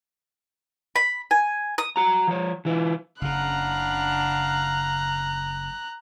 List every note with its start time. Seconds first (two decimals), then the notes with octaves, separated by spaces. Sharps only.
0.96 B5
1.31 G#5
1.78 D#6
1.96 F#4 A#5
2.28 F3 C#5
2.65 E3 E4 F4
3.22 F#1 C#3 D4 F5 F#5 A#5 B5 F#6